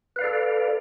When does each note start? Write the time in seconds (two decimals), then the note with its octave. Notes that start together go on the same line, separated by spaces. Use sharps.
0.16 B4
0.19 F5
0.21 D5
0.24 A4